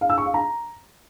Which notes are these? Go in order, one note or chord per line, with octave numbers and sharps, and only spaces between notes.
F5
E6
C#6
F5
A#5